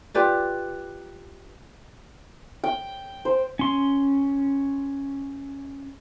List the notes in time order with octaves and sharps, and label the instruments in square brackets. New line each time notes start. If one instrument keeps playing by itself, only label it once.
[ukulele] F4 G4 B4 D5
[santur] G5
C5
[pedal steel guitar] C#4 C6